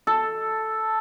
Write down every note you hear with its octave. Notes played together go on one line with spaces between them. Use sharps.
A4